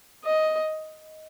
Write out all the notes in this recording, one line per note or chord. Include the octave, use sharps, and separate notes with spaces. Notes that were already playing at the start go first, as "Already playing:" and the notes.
D#5